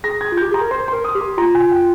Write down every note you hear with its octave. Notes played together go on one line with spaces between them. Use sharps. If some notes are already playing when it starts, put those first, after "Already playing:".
G#4 A#6
G#6
F4
G4 G6
G#4 A#5
A#4
C5 C6
A#4 C6
D#6
G4
C6
F4 A#5
G#5
G5